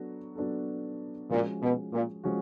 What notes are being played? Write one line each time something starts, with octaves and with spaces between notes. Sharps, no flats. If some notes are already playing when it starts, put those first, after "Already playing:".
Already playing: F#3 B3 D4 F#4 A4
F#3 B3 D4 F#4 A4
A#2 F3 G#3 C#4 F#4
B2
A#2
F3 G#3 C#4 F#4